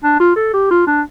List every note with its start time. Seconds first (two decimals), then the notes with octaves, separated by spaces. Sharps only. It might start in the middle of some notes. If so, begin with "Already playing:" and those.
0.04 D4
0.20 F4
0.36 A4
0.54 G4
0.71 F4
0.87 D4